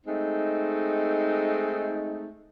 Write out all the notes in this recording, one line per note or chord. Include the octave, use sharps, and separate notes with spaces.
G#3 A3 C4 D#4